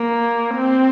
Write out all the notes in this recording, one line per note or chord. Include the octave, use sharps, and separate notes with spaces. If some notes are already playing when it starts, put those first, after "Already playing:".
Already playing: A#3
C4